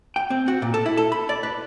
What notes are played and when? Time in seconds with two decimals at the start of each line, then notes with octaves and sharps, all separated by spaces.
0.16 G5
0.30 C4
0.48 F#4
0.62 A#2
0.74 A4
0.86 E4
0.97 A4
1.12 B5
1.29 D5
1.43 B4